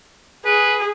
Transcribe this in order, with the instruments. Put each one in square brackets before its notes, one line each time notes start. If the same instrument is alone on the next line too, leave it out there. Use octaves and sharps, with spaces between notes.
[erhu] G#4 [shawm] B4